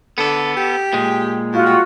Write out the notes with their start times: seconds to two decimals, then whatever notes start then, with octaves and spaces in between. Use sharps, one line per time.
0.18 D3 B3 A4
0.56 G4
0.93 A#2 G#3
1.52 A2 F4 F#4
1.66 G3